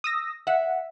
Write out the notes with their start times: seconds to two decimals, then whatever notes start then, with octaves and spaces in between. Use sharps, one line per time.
0.04 D#6 E6 A#6
0.47 E5 F#5